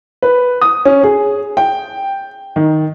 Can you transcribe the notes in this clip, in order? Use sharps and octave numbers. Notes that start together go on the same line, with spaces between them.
B4
D#6
C#4
G#4
G5
D#3